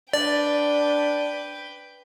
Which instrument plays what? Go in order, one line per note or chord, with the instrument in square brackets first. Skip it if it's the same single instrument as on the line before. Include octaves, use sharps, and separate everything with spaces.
[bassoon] D4 [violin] B4 G5 [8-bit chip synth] D5